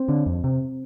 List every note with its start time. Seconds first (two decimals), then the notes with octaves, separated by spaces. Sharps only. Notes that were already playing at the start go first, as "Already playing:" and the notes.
Already playing: C4
0.09 D3
0.26 F2
0.44 C3